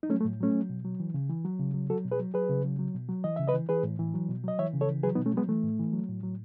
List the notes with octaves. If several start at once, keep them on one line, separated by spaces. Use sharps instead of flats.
D#4
F#3 A3 C#4
A3
A2
F#3 A3 C#4
F#3
B2
F#3
E3
C#3
E3
F#3
C#3
F#3
F#3 F#4 A4
B2
G#4 B4
F#3
F#3 G#4 B4
C#3
F#3
F#3
B2
F#3
E3 D#5
C#3 E5
B4 D#5
E3
E3 G#4 B4
A2
E3
F#3
B2
F#3 D#5
E3 C#5 E5
C#3
A4 C#5
E3
F#3 G#4 B4
B3 D#4
B2
A3 C#4
F#3 G#3 B3
E3 A3
A2
E3
F#3
A2
F#3